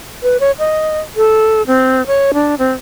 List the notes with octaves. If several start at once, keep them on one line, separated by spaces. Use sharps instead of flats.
B4
C#5
D#5
A4
C4
C#5
D4
C4